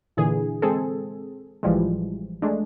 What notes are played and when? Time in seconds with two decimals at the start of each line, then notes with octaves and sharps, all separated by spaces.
0.17 A#2 D3 E3 G#4
0.62 G#3 C4 G#4 A4
1.63 A1 E3 F3 G3 G#3
2.42 G#3 A3 D4